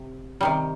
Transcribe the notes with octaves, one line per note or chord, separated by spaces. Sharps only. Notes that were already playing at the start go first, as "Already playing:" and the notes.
Already playing: C3
C3 D#3 G3